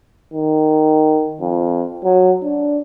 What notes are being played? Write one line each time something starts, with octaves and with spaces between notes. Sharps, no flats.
D#3
F2
F#3
D4